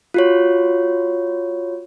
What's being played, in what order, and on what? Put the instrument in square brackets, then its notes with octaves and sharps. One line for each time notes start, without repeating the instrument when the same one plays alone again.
[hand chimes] F4 F#4 C#5